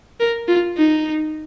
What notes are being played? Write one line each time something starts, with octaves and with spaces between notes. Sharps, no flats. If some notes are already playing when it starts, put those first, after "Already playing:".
A#4
F4
D#4